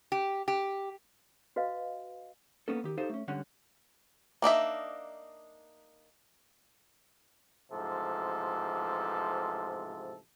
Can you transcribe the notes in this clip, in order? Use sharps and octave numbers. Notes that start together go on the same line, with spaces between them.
G4
G4
F#4 B4 D#5 F5
A#3 B3 C#4 A4
D#3 G4
D#4 G4 A4 C5 F5
A3 C#4
C#2 G2 D3 G3 C#4 F#5
A#3 D4 D#4 E5
A1 G#2 C3 F3 A4